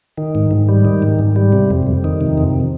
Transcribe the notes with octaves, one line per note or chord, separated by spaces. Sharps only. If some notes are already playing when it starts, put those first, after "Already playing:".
D#3
G#2
G#2
G3
D#3
G#2
G#2
G3
C3
F2
F2
D#3
C3
F2